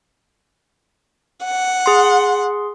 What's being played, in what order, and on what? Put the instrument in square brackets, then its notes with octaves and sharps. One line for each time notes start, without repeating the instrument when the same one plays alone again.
[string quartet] F#5
[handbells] G#4 C6